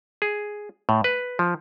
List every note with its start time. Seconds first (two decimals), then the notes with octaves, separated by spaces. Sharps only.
0.22 G#4
0.89 A2
1.04 B4
1.39 F3